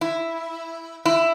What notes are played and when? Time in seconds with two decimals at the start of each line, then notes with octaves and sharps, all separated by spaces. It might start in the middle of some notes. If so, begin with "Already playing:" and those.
0.01 E4
1.05 E4